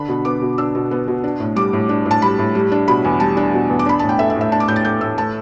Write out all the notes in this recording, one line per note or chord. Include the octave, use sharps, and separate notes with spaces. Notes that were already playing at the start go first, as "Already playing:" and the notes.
Already playing: D3 D4 B5
B2
B3 D6
B2
D4 E6
B2
B3
B2
D4
A2
G3 D6
A2
D4
A2
A5
G3 B5
A2
G3
D4
B2 B5
E2
G3 A5
D4
B2
E2
D6
D4 B5
A2 A5
G5
A3 E5
E5
A2
E5
D4 A5
D6
A2 G6
A6
A3 G6
A2 E6
A3 A5